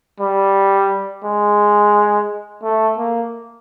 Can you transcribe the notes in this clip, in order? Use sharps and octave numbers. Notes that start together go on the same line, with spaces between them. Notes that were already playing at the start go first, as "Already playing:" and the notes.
G3
G#3
A3
A#3